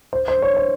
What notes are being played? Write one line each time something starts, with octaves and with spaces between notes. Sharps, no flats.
C5
C5
C#5
C5